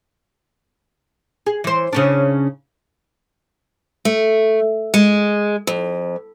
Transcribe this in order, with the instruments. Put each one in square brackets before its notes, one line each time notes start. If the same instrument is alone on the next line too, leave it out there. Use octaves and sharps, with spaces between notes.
[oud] G#4
E3 C5
C#3 C#4 D4
[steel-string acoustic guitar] A3
G#3
F2